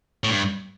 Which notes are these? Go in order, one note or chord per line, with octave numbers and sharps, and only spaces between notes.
A2
G2